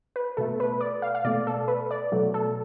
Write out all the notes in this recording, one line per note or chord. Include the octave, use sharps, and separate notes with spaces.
B4
B2 A3 A4
B4
D5
F5
F5
B2 A3 D5
A4
B4
D5
B2 F#3 A3
A4